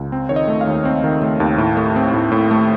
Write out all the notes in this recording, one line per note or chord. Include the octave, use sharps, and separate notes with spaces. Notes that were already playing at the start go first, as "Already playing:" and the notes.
Already playing: C#2
C4
D#3 C#5
D#5
A3
F5
D#2
C4
D#3
A3
D#2
A2
A3
C4
A2
A2
A3